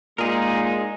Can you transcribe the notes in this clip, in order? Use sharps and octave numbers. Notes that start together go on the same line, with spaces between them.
A#2 G#3 D#4 G#4 A#4